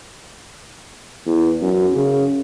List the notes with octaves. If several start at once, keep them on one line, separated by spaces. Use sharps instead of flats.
E2
F#2
C#3